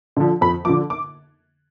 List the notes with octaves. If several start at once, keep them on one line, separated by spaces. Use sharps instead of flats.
D3 F3
F2 B5
D3 F3 D6
D6